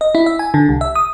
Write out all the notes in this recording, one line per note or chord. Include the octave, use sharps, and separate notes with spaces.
D#5
E4
E5
G#5
D3
C2
E5
D#6